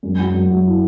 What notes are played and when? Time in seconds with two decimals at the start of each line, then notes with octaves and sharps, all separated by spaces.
0.03 F#2
0.19 F#3
0.34 F#2
0.50 F#3
0.65 E4